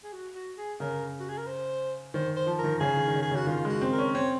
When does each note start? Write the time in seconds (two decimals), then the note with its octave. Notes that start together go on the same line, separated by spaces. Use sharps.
0.04 G#4
0.13 F#4
0.35 F#4
0.57 G#4
0.80 C#3 A#4
1.20 F#4
1.29 G#4
1.38 A#4
1.47 C5
2.14 D#3 C5
2.36 C5
2.47 F3
2.59 A#4
2.64 D#3
2.80 C#3 G#4
2.97 D#3
3.07 D#3
3.14 C#3
3.22 G#4
3.31 C#3 F#4
3.47 D#3 F4
3.65 G#3 F#4
3.81 C4
3.92 A#4
3.98 C#4
4.14 C4 C#5